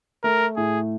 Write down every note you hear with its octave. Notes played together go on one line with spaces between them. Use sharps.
A3 A#4
A2 G#4